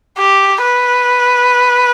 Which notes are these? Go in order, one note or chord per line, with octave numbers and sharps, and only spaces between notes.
G4
B4